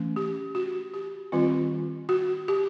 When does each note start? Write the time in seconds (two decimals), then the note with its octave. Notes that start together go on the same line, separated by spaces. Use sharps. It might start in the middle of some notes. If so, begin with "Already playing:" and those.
Already playing: E3 A3 C#4
0.16 G4
0.55 F#4
0.94 G4
1.32 D#3 G3 C4 F4
2.09 F#4
2.48 G4